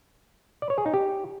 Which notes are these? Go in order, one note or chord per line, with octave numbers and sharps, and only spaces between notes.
D5
C#5
G#4
D#4
G4